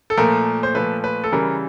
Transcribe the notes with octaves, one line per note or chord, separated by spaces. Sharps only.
A4
A#2 F3 A3 A#4
C5
A#2 F3 A3 B4
B4
A4
C#3 E3 G3 A#4